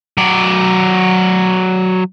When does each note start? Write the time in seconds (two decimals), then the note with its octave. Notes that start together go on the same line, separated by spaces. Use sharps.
0.18 F#3 D5